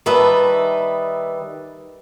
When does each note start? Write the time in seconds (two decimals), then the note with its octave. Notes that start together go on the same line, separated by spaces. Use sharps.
0.06 D#3 G3 B4 D#5 E5 A5